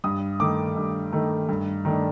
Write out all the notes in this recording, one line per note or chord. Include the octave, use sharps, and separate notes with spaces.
G2 D#6
D#3 A3 D6
G2
D#3 A3
G2
D#3 A3 D4